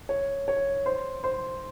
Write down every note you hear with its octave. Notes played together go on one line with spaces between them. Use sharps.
C#5
C#5
C5
C5